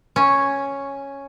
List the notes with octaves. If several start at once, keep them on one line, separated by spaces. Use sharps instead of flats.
C#4